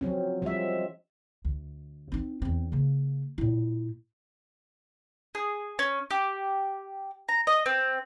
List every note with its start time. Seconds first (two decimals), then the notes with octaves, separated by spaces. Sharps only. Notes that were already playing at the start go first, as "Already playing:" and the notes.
0.01 F3 F#3 C4 C#4
0.42 F3 G3 G#3 E5
1.45 D2
2.12 C4 D#4
2.42 E2 C4
2.72 C#3 A#3
3.38 A#2 E4
5.35 G#4
5.79 C#4
6.11 G4
7.29 A#5
7.47 D#5
7.66 C4